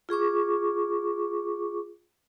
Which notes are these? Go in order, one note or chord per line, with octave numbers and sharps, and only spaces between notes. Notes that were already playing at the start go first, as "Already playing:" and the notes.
F4 G#4 C#6 D6